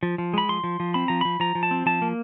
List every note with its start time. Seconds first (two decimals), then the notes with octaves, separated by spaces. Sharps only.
0.03 F3
0.18 F3
0.34 G#3 B5
0.49 F3 C6
0.64 F3
0.80 F3
0.94 C4 B5
1.08 F3 A#5
1.21 F3 B5
1.40 F3 A#5
1.55 F3
1.63 A5
1.71 C4
1.86 F3 A5
2.02 A#3